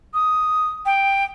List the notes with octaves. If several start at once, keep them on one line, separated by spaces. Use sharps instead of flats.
D#6
G5